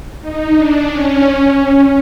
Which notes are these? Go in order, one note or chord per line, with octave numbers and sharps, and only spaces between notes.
D#4
D4
C#4